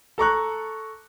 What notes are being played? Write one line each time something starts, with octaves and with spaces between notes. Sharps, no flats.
A4 A#5 C#6 F#6